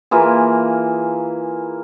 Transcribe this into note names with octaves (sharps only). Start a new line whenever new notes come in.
E3 A#3 F4 G#4